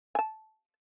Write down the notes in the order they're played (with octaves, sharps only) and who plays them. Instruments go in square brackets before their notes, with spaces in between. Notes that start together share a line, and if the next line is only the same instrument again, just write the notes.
[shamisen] G#5 A5